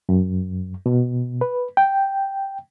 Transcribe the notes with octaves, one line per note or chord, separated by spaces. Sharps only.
F#2
B2
B4
G5